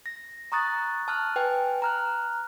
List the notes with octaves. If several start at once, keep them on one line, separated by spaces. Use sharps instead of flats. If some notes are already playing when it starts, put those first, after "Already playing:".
A#6
A#5 C#6 D#6 F#6 A6
A5 F6 F#6
B4 G5 G#5
A#5 F6 F#6